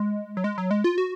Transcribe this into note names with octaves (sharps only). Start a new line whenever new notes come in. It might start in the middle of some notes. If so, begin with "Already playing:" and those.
Already playing: G#3
F#3
G#3
F#3
G#3
F4
F#4